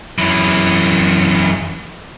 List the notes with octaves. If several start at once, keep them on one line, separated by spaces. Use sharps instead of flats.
F#2 E3